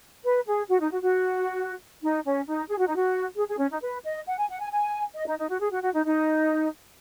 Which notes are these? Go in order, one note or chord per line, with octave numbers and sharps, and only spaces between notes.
B4
G#4
F#4
D#4
F#4
F#4
D#4
C#4
D#4
G#4
F#4
D#4
F#4
G#4
G#4
C#4
D#4
B4
D#5
F#5
G#5
F#5
G#5
G#5
D#5
D#4
D#4
F#4
G#4
F#4
F#4
D#4
D#4